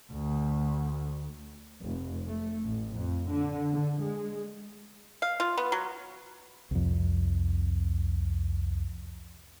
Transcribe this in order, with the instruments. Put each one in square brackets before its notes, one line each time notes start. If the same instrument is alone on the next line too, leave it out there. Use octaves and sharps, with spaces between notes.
[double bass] D2
[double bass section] F1
A3
A1
F2
D3
D3
G#3
[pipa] F5
F4
B3
F#3
[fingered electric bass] C2 F2